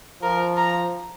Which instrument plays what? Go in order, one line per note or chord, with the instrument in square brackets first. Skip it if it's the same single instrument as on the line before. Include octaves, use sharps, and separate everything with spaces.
[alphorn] F3 [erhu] A#4
[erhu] A#5